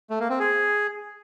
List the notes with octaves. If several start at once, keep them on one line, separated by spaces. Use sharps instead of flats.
A3
A#3
C4
G#4